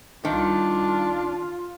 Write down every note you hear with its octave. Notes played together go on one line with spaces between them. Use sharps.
C2 D#3 D4 F4